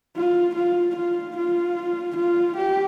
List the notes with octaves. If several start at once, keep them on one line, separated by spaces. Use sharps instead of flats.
F4
F4
F4
F4
F4
G4